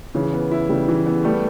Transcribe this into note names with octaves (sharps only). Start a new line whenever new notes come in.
C#3 E3
B3
E4
C#3 G3
E3
B3
G3 A3